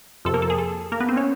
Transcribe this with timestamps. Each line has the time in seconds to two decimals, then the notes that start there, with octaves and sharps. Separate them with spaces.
0.25 F2 C3 F3 A4
0.34 A#3 A#4
0.42 A4
0.50 G#4
0.58 A4
0.92 A#3 A#4
1.00 B3 B4
1.09 C4 C5
1.16 C#4 C#5